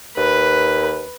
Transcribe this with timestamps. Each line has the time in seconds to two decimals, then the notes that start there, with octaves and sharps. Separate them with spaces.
0.17 D#2 B4